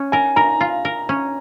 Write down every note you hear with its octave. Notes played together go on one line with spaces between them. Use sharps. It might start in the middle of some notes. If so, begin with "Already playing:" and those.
Already playing: C#4
A#4 G#5
A#4 A#5
F4
A#4
C#4